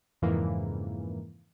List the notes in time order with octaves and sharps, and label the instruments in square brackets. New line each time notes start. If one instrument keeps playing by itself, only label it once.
[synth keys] F2 G#2 C#3 E3 A#3